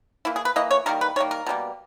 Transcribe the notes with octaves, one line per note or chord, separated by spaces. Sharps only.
E3 A#3 E4
G#4
B4
E3 A#3 D#5
C#5
D#3 G3 A#3 A#4
B4
D#3 G3 A#3 C#5
A#4
B2 G3 A#3